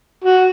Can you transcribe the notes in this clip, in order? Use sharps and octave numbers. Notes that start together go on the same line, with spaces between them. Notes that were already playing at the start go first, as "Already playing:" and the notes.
F#4